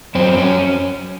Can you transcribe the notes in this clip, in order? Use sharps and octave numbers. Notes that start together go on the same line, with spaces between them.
F#2 C4
F#2 C#4